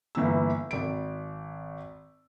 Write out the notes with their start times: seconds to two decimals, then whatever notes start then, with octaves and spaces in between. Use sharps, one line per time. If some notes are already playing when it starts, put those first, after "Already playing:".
0.15 G1 E3 A#3 E6
0.71 G#1 D7